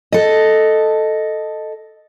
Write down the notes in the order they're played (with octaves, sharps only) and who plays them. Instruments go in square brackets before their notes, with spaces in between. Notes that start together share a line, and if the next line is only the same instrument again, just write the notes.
[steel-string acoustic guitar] A4 D#5